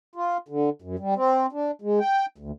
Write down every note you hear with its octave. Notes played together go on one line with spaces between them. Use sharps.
F4
D3
F#2
G3
C4
D4
G#3
G5
D2